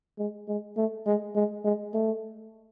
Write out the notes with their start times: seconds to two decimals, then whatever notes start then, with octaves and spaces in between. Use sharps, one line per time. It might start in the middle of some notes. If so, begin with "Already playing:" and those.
0.18 G#3
0.48 G#3
0.77 A3
1.06 G#3
1.35 G#3
1.64 G#3
1.94 A3